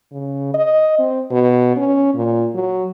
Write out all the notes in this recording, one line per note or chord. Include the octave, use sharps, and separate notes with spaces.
C#3
D#5
C4
B2
C#4
A#2
F#3